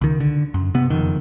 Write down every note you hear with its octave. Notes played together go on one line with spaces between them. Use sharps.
C#2 D#3
D3
F#2
C3 B3
F#1 F2 D#3